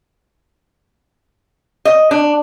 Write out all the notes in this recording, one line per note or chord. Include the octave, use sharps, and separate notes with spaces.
D#5
D4